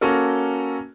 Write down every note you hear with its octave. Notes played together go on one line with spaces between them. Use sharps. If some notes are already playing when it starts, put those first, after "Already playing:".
A#3 C#4 F#4 A4 A#4